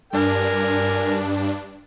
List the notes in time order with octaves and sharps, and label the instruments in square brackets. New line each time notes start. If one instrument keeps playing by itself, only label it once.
[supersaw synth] G2 D4 [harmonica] A#4 G#5